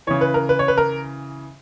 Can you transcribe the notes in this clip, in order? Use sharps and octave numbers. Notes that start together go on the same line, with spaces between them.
C#3 E3 C#5
B4
A#4
B4
C#5
B4
A#4